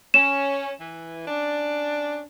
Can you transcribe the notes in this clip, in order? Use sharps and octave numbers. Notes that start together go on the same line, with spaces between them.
C#4 E7
E3
C#4 D4